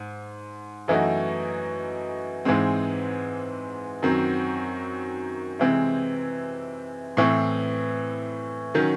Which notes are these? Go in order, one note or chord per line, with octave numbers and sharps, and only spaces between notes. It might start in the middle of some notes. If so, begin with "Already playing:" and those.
Already playing: G#2
F#2 E3 A3 D#4 F#4
G#2 E3 G#3 C4
F#2 D#3 F#3 C4
C3 E3 G#3 C4
A2 E3 C4
D#3 F#3 C#4